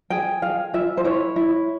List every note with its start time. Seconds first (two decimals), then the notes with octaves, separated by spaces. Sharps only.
0.10 G#4 G5
0.42 G#4 F5
0.74 F4 E5
0.97 C5
1.04 E4 C#5
1.36 E4